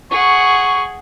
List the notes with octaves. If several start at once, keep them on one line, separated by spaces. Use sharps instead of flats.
G#4 F#5 C#6